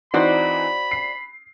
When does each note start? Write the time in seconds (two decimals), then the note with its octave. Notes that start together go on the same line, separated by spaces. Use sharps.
0.14 E3 C4 D#4 F#4 C5 D5 B5
0.91 C7